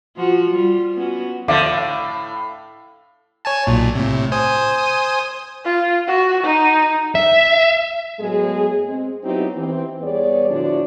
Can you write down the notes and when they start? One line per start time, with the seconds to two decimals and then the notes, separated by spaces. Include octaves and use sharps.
0.16 F3 F4 F#4
0.49 G3 F4
0.94 B3 C#4 F#4
1.48 D3 F3 E5 F5 D6
1.66 A2
3.45 C#5 G#5 A5
3.67 B1 A#2
3.95 A2 C3
4.32 C5 G#5 D#6
5.65 F4
6.08 F#4
6.43 D#4
7.15 E5
8.20 A2 F#3 G#3 B3 G#4
8.88 G#3 C4
9.24 F#3 B3 C4 D#4 E4 G4
9.57 E3 C4
10.02 E2 G3 B3 G#4 C#5 D5
10.49 A2 D3 F3 D4 E4 F#4